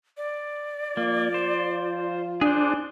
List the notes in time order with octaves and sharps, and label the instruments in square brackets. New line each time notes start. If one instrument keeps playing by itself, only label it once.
[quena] D5
[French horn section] F3 F4 [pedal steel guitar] A#3
[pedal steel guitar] C5
[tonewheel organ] D4 [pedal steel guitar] G#4 C5